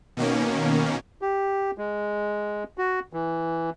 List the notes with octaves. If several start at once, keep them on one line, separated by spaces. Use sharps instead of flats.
B2 D#3 A#3 C#4
G4
G#3
F#4
E3